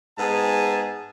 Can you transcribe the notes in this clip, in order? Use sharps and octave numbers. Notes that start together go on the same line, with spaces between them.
G#2 B3 G#4 A5